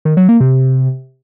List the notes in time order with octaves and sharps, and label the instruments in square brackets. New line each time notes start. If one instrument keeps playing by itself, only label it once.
[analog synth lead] D#3
F#3
A#3
C3